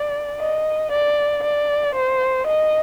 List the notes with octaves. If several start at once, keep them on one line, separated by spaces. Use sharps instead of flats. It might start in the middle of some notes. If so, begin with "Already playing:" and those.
Already playing: D5
D#5
D5
D5
C5
D#5